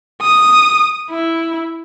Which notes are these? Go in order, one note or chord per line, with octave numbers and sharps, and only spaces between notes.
D#6
E4